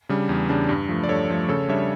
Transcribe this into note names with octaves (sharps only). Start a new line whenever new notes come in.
C#3 G3 D4
E2
C#3 G3 D4
G2
F3 A3
D5
G2 A4 C#5
F3 A3
C#3 A4 C#5
G3 D4 C#5 E5